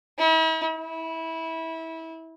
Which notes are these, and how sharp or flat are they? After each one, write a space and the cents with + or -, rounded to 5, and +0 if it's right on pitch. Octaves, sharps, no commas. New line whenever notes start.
E4 -45
E4 -20